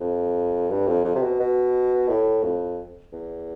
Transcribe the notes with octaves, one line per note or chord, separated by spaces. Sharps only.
F2
G2
F2
F2
C3
B2
B2
A2
F2
E2